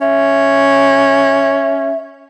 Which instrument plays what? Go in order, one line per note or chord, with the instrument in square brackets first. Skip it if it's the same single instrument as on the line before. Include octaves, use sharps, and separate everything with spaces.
[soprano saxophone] C#4 [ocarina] E5